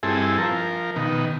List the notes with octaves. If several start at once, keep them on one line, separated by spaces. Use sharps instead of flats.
G2 C4 E4 G#4 A4
F3 A#4
B2 D#3